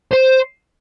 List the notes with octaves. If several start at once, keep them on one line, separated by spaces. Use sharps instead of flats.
C5